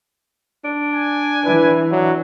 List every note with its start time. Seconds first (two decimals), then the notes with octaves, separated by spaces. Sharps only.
0.64 D4
0.94 G#5
1.45 E3 B4
1.91 F#3 D4